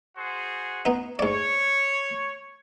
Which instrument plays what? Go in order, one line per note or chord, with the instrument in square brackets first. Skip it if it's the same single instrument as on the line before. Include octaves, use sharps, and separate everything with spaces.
[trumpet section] F#4 G#4 C5
[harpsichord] B3 D#4
[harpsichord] G#2 D5 [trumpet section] C#5